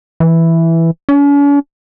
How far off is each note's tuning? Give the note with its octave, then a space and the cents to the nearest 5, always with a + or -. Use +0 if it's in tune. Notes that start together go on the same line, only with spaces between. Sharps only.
E3 +0
C#4 +45